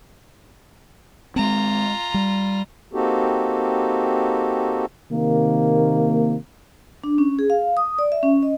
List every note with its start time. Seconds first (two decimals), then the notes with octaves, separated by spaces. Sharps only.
1.36 G#3 C4 F4 A#5
2.14 G3
2.93 A#3 C4 D#4 F#4 G4 A4
5.12 C3 D#3 A#3
7.04 D4
7.18 C#4
7.39 G#4
7.50 F5
7.77 D#6
7.98 D5
8.12 E5
8.23 C#4
8.43 D#5